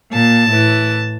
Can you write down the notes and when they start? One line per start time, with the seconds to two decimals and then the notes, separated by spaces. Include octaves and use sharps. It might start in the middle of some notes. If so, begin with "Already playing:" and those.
0.13 A#2 A5
0.51 A2 E3